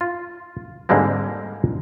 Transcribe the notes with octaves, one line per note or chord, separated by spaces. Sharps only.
F4
G#2 D3 G3 G#3 A#3 C4